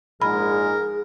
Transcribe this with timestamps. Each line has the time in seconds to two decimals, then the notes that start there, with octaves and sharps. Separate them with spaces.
0.22 A#1 G#2 G#3 G#4 A#4 B5